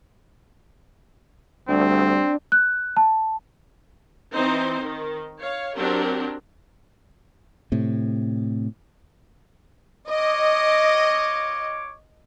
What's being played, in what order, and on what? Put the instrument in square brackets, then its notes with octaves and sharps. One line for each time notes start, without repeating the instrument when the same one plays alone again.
[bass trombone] D2 [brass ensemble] G3 [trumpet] C4 [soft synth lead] D4
[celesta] F#6
A5
[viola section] E3 C4 D#4 C5
D#3
C#5 F5
F#3 C4 D4 G4 A#4
[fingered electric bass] A2 C3
[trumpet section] F4 C#5 D6 [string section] D#5